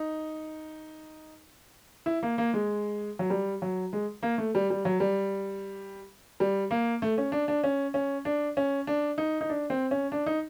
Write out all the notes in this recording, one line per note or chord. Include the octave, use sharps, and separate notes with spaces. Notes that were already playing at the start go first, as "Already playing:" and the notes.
Already playing: D#4
E4
A#3
A#3
G#3
F#3
G3
F#3
G#3
A#3
A3
G3
G3
F#3
G3
G3
A#3
A3
C#4
D4
D4
C#4
C#4
D4
C#4
D4
D#4
D#4
D4
C4
C#4
D4
D#4